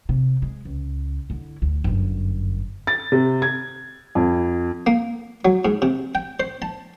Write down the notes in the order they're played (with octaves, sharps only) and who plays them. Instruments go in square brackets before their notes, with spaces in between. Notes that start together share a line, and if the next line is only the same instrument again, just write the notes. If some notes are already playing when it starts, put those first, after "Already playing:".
[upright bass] C3
G#3
C#2
D3 E4
D2
G1 F#2
[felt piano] A6
C3
G#6
F2
[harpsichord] A#3
F#3
G#2
C3
G5
C5
A5